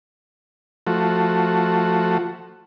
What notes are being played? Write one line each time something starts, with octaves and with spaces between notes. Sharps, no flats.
F3 A3 F#4